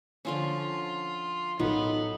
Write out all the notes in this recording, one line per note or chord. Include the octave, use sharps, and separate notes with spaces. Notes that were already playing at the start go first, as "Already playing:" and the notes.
D3 F3 C#4 F4
A1 F#3 B3 D#4 A4